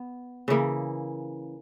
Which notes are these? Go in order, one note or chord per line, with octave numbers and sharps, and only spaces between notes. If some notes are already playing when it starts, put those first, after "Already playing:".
Already playing: B3
C#3 E3 A#3